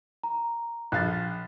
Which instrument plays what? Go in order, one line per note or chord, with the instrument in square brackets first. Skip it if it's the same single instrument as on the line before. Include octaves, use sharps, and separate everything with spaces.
[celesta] A#5
[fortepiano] A#1 F5 [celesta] F#6 A6